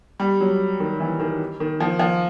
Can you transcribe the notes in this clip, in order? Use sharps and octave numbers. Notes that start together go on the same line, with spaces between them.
G3
F#3
D#3
E3
D#3
D#3
F3
F3